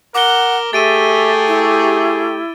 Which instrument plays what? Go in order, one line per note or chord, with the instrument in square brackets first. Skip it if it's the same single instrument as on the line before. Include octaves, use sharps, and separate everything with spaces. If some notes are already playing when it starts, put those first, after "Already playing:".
[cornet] A#4 [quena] F#5 [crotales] D6 G7
[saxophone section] A3 G4 [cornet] G#4 [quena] E5 [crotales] A6 D7 D#7
[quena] E4